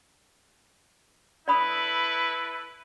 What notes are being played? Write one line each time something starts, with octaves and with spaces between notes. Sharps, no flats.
E4 A4 B4 D5 B5 D#6